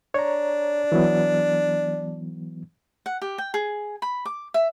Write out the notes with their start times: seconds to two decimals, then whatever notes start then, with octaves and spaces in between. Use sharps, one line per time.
0.14 D4 C#5 A#5
0.92 E3 F#3 B3
3.06 F#5
3.22 G4
3.38 G5
3.54 G#4
4.02 B5
4.25 D6
4.54 E5